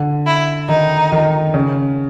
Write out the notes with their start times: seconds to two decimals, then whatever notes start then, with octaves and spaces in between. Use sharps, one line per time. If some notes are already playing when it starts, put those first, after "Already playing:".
Already playing: D3
0.27 E4
0.69 D#3 D#4
1.12 D#3
1.54 C#3